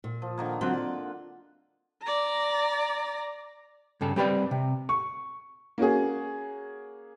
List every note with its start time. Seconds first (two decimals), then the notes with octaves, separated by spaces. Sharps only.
0.04 A#2
0.22 F3
0.38 D3 D#3 A#3
0.61 D3 F#3 C4 F4 F#5
0.74 D5
2.02 D5 A#5
4.01 G2 C#3 A4
4.16 G3 C4 G4 B4 C5 D5
4.51 C3
4.89 C#6
5.78 A#3 C#4 F#4 G#4